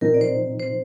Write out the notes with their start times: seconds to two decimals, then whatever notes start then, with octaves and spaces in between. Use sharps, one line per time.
0.01 A#2 F3 C4 D#4 A#4
0.14 D5
0.21 C5
0.60 C5